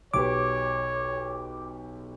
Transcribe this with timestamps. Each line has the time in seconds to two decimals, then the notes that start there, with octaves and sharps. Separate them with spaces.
0.14 B1 G4 B4 C#5 D6